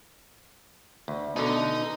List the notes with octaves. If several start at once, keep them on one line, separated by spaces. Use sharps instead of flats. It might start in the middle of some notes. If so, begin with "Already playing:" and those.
D2
B2 D3 D#4